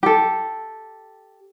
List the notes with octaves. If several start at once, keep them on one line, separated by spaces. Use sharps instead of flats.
G4 A4